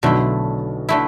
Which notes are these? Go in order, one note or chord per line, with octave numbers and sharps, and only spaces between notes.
B1 B2 D3 A3 E4
D3 A3 E4